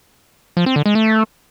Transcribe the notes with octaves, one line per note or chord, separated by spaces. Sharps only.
F3
C4
D3
G#3
A3